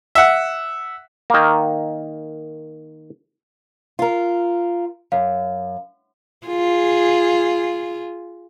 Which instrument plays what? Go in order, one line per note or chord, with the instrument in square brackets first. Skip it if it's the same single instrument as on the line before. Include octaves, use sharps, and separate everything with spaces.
[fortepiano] E5 F#5
[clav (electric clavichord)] D#3 A#3
[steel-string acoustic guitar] F4 A#4
[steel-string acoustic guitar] F#2 [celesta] F5
[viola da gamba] F4 G#4